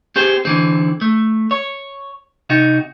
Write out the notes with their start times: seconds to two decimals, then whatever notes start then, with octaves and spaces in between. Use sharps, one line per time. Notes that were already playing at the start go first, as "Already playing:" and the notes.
0.16 C4 G4 G#4 C5
0.45 D3 E3 C4
1.01 A3
1.51 C#5
2.50 C3 D#4 F#4